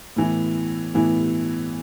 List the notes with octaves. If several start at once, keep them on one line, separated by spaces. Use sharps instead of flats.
A2 E3 B3 E4
A2 E3 B3 E4